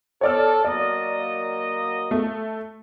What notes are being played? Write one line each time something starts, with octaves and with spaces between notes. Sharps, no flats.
A4 C#5 D5 F6
F#3 A#3 D5 D#5
A3